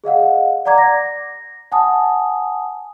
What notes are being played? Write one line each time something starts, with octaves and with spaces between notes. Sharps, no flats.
G#4 D#5 F5 F#5
D5 F#5 A#5 D6 G#6
A#6
F#5 G#5 A5 D#6